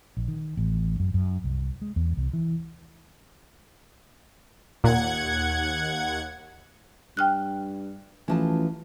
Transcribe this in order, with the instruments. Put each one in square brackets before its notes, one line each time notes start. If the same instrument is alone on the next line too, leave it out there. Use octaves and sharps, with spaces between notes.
[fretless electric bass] A#1
D#3
A1
F#2
F#2
C2
G#3
E2
C2
E3
[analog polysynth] D#2 F#5 G#6 [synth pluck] A#2
[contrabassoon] G2 [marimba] G5 F6 F#6
[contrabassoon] A1 [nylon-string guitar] E3 F3 A5